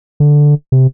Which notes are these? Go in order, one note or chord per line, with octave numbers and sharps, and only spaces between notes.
D3
C3